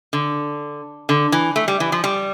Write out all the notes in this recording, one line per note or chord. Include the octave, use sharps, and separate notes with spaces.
D3
D3
E3
A3
G3
E3
F3
G3